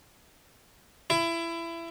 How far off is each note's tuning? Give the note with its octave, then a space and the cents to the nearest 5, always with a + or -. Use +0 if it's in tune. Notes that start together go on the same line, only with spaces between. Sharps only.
E4 +25